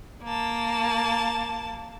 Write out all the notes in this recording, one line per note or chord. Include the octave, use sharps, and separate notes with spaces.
A#3 A5